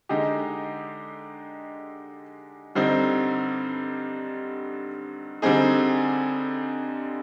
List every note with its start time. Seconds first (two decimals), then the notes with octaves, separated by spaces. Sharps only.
0.09 D3 G#3 D#4 G4
2.75 G2 D3 G3 C4 D#4
5.42 D3 G3 C4 D#4 G#4